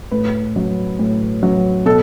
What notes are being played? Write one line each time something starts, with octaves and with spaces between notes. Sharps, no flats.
A2 B4
F#3
A2
F#3
B2 A4